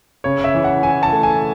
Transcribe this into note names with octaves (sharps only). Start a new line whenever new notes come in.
C#3 C#5
E5
E3
F#5
E3 G#5
A5
A3
G#5